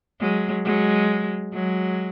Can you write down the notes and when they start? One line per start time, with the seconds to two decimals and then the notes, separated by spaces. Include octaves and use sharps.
0.20 F#3 G#3
0.64 F#3 G#3
1.53 F#3 G#3